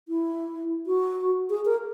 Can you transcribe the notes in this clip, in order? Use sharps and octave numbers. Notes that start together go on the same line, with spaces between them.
E4
F#4
G#4
A#4